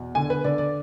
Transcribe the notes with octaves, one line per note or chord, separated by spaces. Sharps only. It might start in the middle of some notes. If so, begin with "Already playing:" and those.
Already playing: E2 B2
D3 G#5
B4
D3 D5
D5